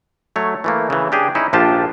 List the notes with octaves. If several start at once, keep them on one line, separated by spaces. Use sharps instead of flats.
F#3 A3 C#5
E3 A3 A#3
C#3 E3
D4 G4 G#4
C#4 D#4 E4
A#1 F3 D4 F4 G4 A5